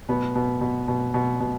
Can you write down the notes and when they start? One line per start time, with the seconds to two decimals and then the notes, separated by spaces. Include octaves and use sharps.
0.09 B2 B3
0.35 B2
0.61 B2
0.88 B2
1.14 B2
1.40 B2